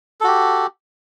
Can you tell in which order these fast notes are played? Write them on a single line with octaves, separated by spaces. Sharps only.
A4 F#4 G4